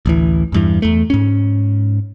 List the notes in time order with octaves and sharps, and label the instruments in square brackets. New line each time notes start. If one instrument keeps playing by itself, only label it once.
[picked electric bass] A1 D2 E3
E2 G2 E3
E2 A3
G#2 C#4